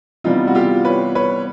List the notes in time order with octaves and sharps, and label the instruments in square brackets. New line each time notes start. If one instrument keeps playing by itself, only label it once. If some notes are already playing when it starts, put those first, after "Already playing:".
[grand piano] C3 E3 G3 B3 D#4 F4
F#4
F4 G4
B4 C#5
B4 C#5